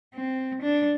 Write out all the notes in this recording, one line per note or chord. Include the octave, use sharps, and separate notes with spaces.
C4
D4